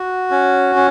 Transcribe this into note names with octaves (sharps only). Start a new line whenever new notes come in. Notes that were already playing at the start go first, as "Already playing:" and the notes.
Already playing: F#4
C#4
C#4